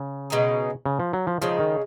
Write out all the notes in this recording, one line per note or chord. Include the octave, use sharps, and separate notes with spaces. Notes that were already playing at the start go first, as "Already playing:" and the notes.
Already playing: C#3
B2 G#3 D#4
C#3
F3
F#3
F3
C#3 F3 G#3 D#4
D#3